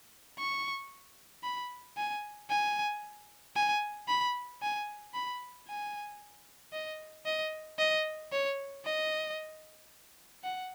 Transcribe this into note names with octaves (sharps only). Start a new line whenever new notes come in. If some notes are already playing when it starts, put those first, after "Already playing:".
C#6
B5
G#5
G#5
G#5
B5
G#5
B5
G#5
D#5
D#5
D#5
C#5
D#5
F#5